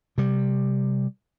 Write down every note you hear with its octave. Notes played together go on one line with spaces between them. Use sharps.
C3 G3